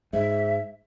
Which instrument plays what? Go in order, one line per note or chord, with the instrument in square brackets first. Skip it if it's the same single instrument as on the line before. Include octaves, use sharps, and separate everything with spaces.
[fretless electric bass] G#2 [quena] E5